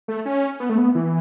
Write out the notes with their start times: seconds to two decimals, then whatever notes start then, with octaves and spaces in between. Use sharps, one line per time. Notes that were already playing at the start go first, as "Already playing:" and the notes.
0.08 A3
0.25 C#4
0.60 B3
0.69 A3
0.78 B3
0.95 E3